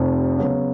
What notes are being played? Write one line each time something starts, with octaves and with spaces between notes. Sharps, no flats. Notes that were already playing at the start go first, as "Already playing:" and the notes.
Already playing: F1 F2 C3
C#3 F#3 B3